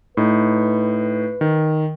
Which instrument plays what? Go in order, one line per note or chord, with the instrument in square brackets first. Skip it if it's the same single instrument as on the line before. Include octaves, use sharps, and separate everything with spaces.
[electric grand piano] A2 D#4 [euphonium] B4
[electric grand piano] D#3